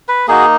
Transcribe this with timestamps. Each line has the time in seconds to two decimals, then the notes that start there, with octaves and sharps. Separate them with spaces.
0.08 B4
0.28 A#3 D#4 F#4 G#4